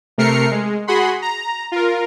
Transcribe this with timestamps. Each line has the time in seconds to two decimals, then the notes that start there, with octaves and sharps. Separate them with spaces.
0.18 C3 A3 A#4 F6 C7 C#7
0.51 G#3
0.87 F#4 G#4 F#5 B5 C6
1.22 A#5
1.72 F4 A#4